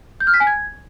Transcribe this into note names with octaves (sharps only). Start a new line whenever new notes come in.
G6
F6
B6
G#5
G#6